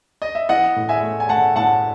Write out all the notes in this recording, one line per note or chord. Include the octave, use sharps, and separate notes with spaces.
D#5
E5
E3 D#5 F#5
A2
E5 G#5
A3
G#5
A3 F#5 A5
A2 F#5 A5